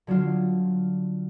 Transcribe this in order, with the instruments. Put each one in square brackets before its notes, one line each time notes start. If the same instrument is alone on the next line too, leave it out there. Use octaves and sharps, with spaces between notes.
[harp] D3 F#3 D4 F4